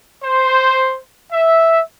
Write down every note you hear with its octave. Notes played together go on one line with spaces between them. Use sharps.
C5
E5